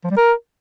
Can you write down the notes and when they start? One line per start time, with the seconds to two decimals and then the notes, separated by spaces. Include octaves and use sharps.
0.04 F3
0.11 G3
0.17 A#4